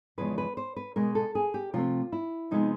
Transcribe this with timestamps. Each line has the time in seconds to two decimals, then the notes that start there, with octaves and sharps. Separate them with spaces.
0.18 E2 C#3 F3 G#3 B4
0.38 B4
0.57 C5
0.76 B4
0.96 B2 G#3 B3 A#4
1.15 A4
1.35 G#4
1.54 G4
1.74 C3 F3 A3 C4 F4
2.12 E4
2.51 C3 F3 G#3 B3 D#4